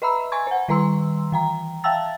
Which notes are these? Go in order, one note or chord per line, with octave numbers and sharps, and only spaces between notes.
B4 D#5 E5 A#5 B5 E6
G#5 A#5 C6 C#6 G#6
C5 F#5
D#3 G3 B4 A#5 C6 E6
E3 G5 A#5
E5 F5 G5 A5 E6 A6